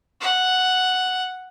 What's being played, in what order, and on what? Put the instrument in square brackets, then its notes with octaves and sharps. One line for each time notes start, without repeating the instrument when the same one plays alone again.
[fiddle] F#5